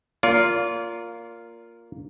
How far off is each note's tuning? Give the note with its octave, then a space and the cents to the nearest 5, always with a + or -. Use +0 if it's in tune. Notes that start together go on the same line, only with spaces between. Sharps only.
A#3 +0 F4 +0 D5 -40